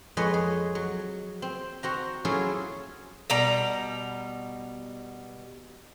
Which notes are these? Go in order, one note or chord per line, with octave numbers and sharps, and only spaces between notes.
F2 G#3 B4 C#5 D#5 G#5
G#4
F#3
C4
C4 F#4 A#5
F#3 C#4 E4 F4 G#4 A4
B2 G3 A#5